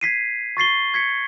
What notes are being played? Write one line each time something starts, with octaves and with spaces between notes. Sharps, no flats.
G#6 B6 C7 D#7
C#6 A6 C7 G7
G#6 B6 C#7